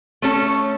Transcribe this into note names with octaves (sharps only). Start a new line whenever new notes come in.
A3 C#4 A4 C#5